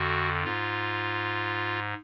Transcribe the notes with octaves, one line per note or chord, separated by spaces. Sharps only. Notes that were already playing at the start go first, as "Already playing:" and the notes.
Already playing: F2 D3 F#4
G#2 F4